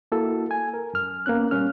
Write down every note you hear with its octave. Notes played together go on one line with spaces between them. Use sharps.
A#3 E4 F#4 A4
G#5
A#4
F#2 F6
A#3 B3 C#4 F#6
A#2 G3 C#4 F6